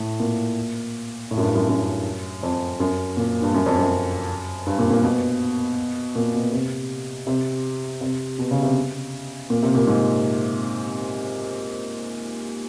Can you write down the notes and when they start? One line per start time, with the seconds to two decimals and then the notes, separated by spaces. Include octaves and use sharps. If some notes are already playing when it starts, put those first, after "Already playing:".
Already playing: A2
0.20 A#2
1.31 A2
1.38 F#2
1.43 G2
1.55 F#2
1.69 F#2
2.43 F2
2.80 F#2
3.17 A#2
3.42 G2
3.54 F#2
3.66 F2
3.79 F#2
4.67 G2
4.79 A#2
4.90 A#2
5.03 B2
6.16 A#2
6.34 B2
6.52 C3
7.27 C3
8.01 C3
8.39 B2
8.51 C#3
8.63 C3
9.50 A#2
9.63 C3
9.75 A#2
9.87 G#2